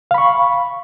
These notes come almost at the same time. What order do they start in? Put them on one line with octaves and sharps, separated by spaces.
F5 B5 C#6